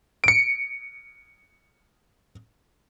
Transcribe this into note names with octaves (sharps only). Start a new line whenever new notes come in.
C#7 D7